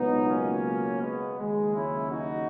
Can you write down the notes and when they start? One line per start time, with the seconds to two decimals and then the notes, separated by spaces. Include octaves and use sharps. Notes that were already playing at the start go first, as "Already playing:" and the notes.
Already playing: C#2 B2 F#3 B3 D#4
0.28 A#3 C#4
1.01 G#3 B3
1.38 D#2 C#3 F#3 G#3
1.75 C#4 E4
2.11 D#4 F#4